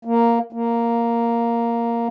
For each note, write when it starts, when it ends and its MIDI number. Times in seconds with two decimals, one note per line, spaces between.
0.05 0.39 58
0.53 2.08 58